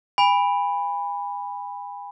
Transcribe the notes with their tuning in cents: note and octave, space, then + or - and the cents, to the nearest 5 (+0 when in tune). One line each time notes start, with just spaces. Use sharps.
G#5 -40 B5 +0